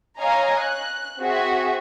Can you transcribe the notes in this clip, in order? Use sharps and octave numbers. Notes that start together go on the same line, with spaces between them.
C#5 D#5 F5 G#5 A#5
F#6
C4 F#4 G#4 E5